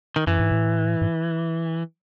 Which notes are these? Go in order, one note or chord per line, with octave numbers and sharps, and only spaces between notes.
D#3
F#2 E3
G#2
A2
G#2